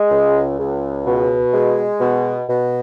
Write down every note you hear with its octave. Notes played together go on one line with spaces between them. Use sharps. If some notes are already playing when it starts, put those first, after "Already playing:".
Already playing: G#3
C#2
C#2
B2
G#3
B2
B2